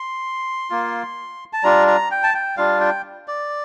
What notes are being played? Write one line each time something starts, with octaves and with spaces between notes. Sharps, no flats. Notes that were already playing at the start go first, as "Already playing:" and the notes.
Already playing: C6
A#3 F4
A5
G3 D4 F4 A#5
A#5
G5
A5
G5
G3 D4 F4 F5
G5
D5